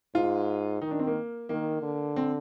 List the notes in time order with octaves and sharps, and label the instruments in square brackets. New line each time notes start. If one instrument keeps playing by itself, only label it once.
[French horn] G#2 [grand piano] F4
[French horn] D#3 [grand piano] D#4
[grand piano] D4
C4
A#3
[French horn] D#3 [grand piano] A#3
[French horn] D3
[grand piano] C4